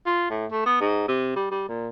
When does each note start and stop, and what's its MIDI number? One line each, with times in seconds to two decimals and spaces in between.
0.06 0.29 65
0.30 0.46 45
0.51 0.63 57
0.66 0.78 59
0.81 1.08 44
1.08 1.33 48
1.36 1.48 55
1.51 1.66 55
1.68 1.90 46